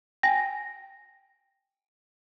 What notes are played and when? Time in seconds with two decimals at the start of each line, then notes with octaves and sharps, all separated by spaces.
0.23 G5 G#5 A#6